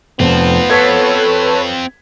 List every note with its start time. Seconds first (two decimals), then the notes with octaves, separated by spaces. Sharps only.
0.20 F1 F2 B3 C4 F4
0.70 A4 B4 C#5 G#6 B6